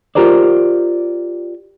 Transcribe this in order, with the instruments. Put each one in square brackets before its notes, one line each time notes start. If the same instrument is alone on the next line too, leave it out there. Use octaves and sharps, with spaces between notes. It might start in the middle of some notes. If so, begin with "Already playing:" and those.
[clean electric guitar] F4 G4 A#4 C5 D5